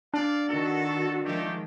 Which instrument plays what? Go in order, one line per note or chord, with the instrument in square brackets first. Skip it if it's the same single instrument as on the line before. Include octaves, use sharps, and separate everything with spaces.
[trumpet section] C4 D5 F5 [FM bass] D4
[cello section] D#3 F#4 [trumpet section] A4
[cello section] D#3 F3 G#3 [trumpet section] A3 G4